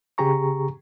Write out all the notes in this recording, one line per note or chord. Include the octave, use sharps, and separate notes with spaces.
C#3 G4 G#4 A#5 C#6